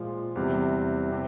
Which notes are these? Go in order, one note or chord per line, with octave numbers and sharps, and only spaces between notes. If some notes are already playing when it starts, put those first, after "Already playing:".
Already playing: A#2 F3 G#3
E2 C3 G3
C3